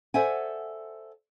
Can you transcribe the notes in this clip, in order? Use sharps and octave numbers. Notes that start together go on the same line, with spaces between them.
A4 C5 D5 E5 F#5 G#5